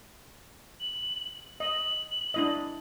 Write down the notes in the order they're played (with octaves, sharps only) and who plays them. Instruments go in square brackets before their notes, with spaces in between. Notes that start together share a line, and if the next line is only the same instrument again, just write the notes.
[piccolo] F#7
[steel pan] D#5 [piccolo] F#7
[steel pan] D4 E4 D#5